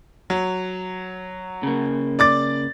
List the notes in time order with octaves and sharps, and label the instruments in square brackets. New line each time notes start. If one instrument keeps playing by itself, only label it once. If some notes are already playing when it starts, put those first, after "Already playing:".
[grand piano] F#3
[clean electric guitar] C#3 A#3
[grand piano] D5 D6 A6